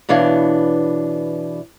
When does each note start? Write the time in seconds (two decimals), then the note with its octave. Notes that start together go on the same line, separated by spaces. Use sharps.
0.09 B2 E3 D4 C#5 F5